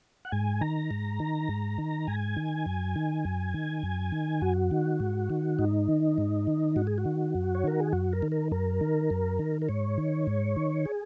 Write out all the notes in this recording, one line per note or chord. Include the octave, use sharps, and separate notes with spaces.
F#5
G#2 G#5
D#3 A#5
G#2
D#3
G#2
D#3
G#2 G#5
D#3
F#2
D#3
F#2
D#3
F#2
D#3
F#2 F#4
D#3
G#2
D#3
G#2 D#4
D#3
G#2
D#3
G#2 F#4
G#4
F#4
D#3
F#2
C#5
D#3 A#4
G#4
F#2 F#4
A#4
D#3
A#4
F#2 A#4
D#3
F#2
D#3
A#4
G#2 C#5
D#3
G#2
D#3
G#4